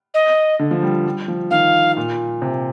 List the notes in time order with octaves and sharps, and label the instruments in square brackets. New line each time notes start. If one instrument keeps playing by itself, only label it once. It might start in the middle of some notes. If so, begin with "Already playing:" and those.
[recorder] D#5
[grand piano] D3
F3
G3
G3
F3
[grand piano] D#3 [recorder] F5
[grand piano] A#2
C3